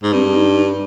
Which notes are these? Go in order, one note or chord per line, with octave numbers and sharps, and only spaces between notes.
G#2
G2 C4
D4
D#4
D4
D#4
D4